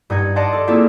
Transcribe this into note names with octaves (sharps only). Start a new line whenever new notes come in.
G2 D#4 F#5 G#6
D5 D#5 F5 F#5 A5 C6
A4 D5
A#3 C4 E4 F4 G#4 A4